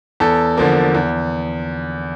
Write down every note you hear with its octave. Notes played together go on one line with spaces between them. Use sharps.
E2 A4
D3 F3 A#3
E2